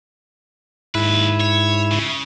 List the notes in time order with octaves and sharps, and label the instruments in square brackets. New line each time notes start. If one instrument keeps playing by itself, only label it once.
[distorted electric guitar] D#2 B4 [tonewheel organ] G#2 E4
[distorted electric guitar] C#5
C#3